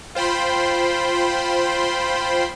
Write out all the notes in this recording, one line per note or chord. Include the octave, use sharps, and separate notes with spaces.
F4 C5 G5 B5 C6